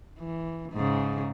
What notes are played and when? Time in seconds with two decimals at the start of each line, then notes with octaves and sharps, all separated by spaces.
0.20 E3
0.73 G#2 C#3